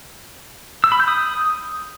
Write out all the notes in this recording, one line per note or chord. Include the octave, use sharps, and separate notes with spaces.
E6
B5
G6
D#6